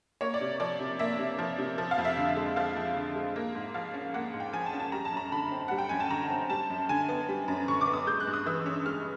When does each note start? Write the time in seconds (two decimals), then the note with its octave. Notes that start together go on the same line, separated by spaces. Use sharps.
0.21 A#3 C#5
0.34 D5
0.41 C3
0.60 F3 D5
0.79 C3
0.99 A#3 E5
1.19 C3
1.39 F3
1.58 C3
1.78 F3
1.91 F5
1.98 F2
2.05 E5
2.17 D3
2.37 G#3
2.56 F3 F5
2.76 F2
2.96 D3
3.16 G#3
3.36 A#3
3.55 G#2
3.74 F3 F5
3.94 C#4
4.14 A#3 F#5
4.34 G#2
4.40 G5
4.53 F3 G#5
4.66 A5
4.73 C#4
4.80 A5
4.92 G3 A#5
5.05 A5
5.12 F#2 A#5
5.32 D3 B5
5.52 C4
5.68 G3 F#5
5.78 G5
5.89 F#2 G#5
6.00 A5
6.11 D3 A#5
6.30 C4
6.50 G3 A5
6.70 F#2
6.89 D3 G#5
7.09 B3
7.29 G3
7.48 F#2
7.68 D3 C#6
7.81 D6
7.87 B3
7.94 D#6
8.07 G#3 G6
8.20 F#6
8.27 G2
8.33 D#6
8.46 E3 E6
8.66 C#4 E6
8.86 G#3 F6